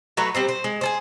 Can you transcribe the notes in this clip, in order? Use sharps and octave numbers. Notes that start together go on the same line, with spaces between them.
F#3 A3 F#4 B4
G3 C4 C5
C5
G#3
G#4 A4 C5